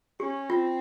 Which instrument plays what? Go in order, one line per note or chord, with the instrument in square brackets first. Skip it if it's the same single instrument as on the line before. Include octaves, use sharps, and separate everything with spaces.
[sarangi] C#4 [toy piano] G4
[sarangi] C4 [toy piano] F4